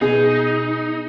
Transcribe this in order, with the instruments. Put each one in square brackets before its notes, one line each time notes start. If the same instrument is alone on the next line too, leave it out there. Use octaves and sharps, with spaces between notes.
[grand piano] B2 [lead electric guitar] D#4 [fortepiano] G#4